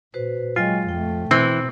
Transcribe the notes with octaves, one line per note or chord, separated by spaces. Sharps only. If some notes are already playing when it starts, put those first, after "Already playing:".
A#2 F#4 B4 C5
F#3 G#3 F4 D#5 G5 G#5
F2 A3 G5
B2 E3 C4